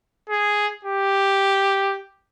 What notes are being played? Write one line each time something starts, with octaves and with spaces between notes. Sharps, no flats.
G#4
G4